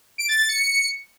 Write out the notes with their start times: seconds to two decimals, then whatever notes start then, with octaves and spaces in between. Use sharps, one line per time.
0.18 D7
0.28 A6
0.39 A6
0.49 C#7